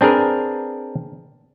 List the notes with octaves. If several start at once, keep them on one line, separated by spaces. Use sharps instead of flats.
C4 D4 G#4 A#4 B4